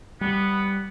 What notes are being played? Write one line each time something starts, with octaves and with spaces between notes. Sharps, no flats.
G3 B3